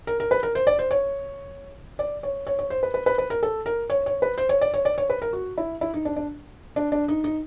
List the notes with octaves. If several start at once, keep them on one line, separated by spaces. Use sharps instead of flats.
A#4
A#4
B4
A#4
C5
D5
C5
C#5
D5
C#5
C#5
C#5
C5
B4
B4
B4
B4
A#4
A4
A#4
C#5
C#5
B4
C5
C#5
D5
C#5
D5
C#5
B4
A#4
F#4
E4
E4
D#4
D4
D4
D4
D4
D#4
D#4